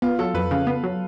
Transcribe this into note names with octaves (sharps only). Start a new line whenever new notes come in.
B3 F4
F#3 A4
F2 B4
C#3 F5
B3
F#3